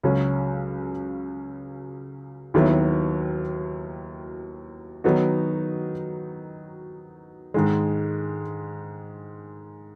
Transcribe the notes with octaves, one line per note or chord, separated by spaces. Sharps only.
C#2 C#3 F#3 C#4
D#2 D#3 F#3 B3 E4
D#3 F#3 B3 D#4 F#4
G#2 D#3 G#3